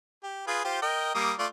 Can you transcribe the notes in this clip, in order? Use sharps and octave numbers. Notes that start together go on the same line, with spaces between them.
G4
F4 G#4 B4
F4 G4 C5
A#4 D#5 G5
G3 A#3 D#6
A3 F4 D5